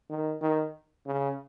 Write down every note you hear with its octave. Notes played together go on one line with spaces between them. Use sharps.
D#3
D#3
C#3